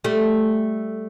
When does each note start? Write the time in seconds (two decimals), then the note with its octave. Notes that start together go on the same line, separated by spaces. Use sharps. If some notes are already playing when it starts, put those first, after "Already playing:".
0.04 G3 A3